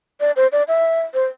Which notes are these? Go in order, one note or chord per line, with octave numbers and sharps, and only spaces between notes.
D5
C5
D5
E5
C5